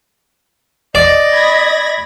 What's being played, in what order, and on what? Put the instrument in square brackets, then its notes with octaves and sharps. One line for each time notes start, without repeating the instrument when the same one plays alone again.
[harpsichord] D5 [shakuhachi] D#5
[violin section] B5 G#6 A#6